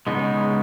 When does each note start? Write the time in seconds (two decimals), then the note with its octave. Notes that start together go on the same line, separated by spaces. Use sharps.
0.07 C#3 G#3 B3 D#4